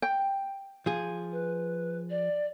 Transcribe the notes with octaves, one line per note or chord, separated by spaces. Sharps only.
G5
F3 G#4
B4
D5